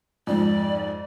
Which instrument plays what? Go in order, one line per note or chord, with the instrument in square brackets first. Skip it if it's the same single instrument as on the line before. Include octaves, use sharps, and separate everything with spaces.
[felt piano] F2 G#2 [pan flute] D5